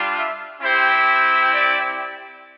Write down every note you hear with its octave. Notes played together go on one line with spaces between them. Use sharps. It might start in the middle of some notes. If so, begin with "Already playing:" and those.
Already playing: G3 D4 F4
E5
C4 E4 G4 C5
D5